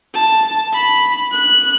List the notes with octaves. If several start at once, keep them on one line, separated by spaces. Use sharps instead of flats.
A5
B5
F#6